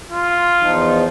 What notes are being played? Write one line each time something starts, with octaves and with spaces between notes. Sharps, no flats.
F4
E2 F3 D#4